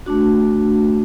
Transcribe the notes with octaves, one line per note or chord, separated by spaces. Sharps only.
A3 D4 F#4